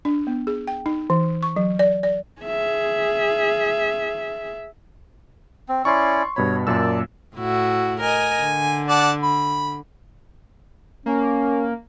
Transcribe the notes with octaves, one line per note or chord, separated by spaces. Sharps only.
D4
B3
G#4
G5
D#4
E3
C#6
F#3
D5
D5
G#4 E5
C4
C#4 E4 D5 C6 C#6
G2 B2 C#5 B5
F#2 A#2 D5 A5 E6
A2 E4 F#4
A#4 D#5 G#5
D3
D5 F#5 A5
B5
A#3 C#4